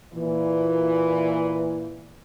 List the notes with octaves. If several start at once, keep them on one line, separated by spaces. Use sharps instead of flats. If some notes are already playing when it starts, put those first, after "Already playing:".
A#2 E3